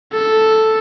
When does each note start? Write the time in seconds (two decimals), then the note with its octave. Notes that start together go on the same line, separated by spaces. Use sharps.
0.13 A4